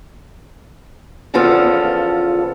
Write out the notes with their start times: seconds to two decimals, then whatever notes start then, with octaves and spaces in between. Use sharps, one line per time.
1.34 E2 C#3 F3 B3 F4 A4